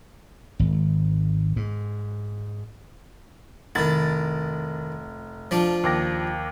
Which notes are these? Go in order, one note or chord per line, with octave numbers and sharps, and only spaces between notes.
G#1
G#2
F1 D#3 E4 A6
F3 D4 F4
D#2 D6 A#6